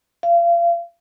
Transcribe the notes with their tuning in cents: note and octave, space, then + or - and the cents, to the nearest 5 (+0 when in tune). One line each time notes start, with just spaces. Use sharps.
F5 -35